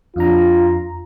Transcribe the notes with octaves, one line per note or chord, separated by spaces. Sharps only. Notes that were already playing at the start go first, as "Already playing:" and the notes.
F2 D4 F4 A#5